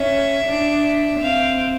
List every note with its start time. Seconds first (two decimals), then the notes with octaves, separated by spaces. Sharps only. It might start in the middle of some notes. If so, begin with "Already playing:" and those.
Already playing: C#4 E5
0.44 D4
1.20 C4 F5